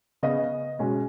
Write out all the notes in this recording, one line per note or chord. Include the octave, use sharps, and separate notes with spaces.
C#3 B3 D#5
B2 G#3 C#4